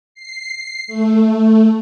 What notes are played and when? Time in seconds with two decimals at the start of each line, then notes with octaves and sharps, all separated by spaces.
0.14 C7
0.87 A3